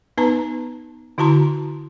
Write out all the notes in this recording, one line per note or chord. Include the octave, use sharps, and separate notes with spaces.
B3 D#4 B4 A5 A#5
D3 E4 F#4 A5 A#5 C6